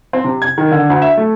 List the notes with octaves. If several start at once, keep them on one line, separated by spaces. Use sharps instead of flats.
C4
C3
G#6
D#3
D3
D2
E5
A3